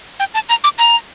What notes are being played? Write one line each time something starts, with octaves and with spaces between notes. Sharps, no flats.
G5
A5
A#5
D6
A#5